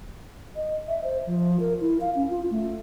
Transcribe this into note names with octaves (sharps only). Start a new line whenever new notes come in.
D#5
E5
C5
F3
A#4
E4
F5
C#4
F4
A3